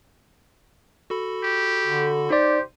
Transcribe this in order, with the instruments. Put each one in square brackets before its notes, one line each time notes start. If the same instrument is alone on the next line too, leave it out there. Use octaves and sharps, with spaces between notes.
[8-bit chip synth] F#4 A4 B5
[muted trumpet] G4
[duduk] D3
[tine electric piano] D#4 D5 [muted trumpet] G4 [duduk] C5